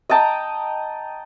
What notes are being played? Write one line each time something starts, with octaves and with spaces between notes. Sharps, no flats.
D#5 G5 A5 A#5